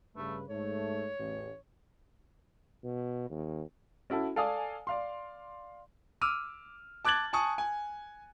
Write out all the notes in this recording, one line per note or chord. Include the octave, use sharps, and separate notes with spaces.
G2 C#3 A3 B4
G#2 A3 C#5
A1 E2
B2
D#2
C#4 E4 F#4 A4
A4 D5 F5 G#5 D#6
D5 F5 C6
D6 E6 F6 D#7
A5 D6 F#6 G#6 A6 F#7
G#5 A5 C#6 D#6
G#5